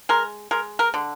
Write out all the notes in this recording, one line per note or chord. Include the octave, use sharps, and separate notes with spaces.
G#3 A#4
G#3 A#4
A#4
D3